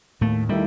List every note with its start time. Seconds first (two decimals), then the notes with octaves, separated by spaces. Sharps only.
0.21 D#2 A2 A3
0.49 D#3 G3 A3 E4